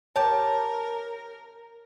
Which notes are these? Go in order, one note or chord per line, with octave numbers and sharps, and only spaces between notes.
G4 A#4 C#5 A5